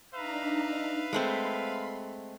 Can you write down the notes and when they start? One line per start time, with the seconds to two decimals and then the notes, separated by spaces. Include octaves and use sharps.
0.14 D4 D#4 B4 E5 F5 A#5
1.13 G#3 A3 C4 B5 C6